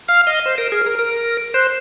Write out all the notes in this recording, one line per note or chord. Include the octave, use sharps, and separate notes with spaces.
F5 F6
D#5 F6
C5
A#4
G#4
A#4
A#4
C5 F#6